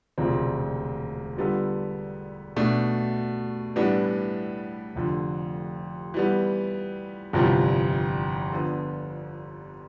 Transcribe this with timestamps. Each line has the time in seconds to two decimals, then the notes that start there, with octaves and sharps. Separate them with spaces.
0.18 E1 D2 C3 F3 C4
1.37 D3 G3 B3 F4 A4
2.56 B2 A3 D4
3.76 A2 E3 G3 B3 D4
4.95 F1 F2 D3
6.14 E3 G3 B3
7.33 G1 F2 C3 E3 G3
8.53 D3 F3 B3